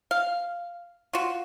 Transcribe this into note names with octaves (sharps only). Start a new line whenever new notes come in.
F5
F4 F#4